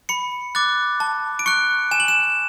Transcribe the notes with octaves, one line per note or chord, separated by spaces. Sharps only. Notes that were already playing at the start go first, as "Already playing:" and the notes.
B5 C#7
D6 F#6 A6
A5
D7
C#6 F#6 C#7
G#5 E7
F#7
E7